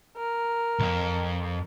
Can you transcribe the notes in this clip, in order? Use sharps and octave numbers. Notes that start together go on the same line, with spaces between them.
A#4
C2 F2